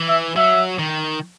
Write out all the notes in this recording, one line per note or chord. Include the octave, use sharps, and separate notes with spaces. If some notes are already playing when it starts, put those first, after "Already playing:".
Already playing: E3
E5
F#3 E5
D#3